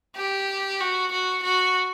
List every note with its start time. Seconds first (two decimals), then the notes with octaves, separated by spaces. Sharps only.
0.17 G4
0.80 F#4
1.12 F#4
1.43 F#4